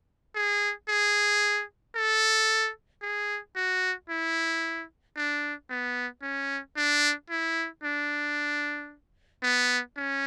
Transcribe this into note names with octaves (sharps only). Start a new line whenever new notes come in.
G#4
G#4
A4
G#4
F#4
E4
D4
B3
C#4
D4
E4
D4
B3
C#4